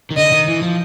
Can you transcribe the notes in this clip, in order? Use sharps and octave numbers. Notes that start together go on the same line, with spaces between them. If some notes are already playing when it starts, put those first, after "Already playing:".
D#3
D3 D#5
D#3
E3
F3